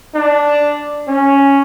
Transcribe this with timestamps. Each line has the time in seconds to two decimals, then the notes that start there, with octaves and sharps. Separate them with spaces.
0.15 D4
1.08 C#4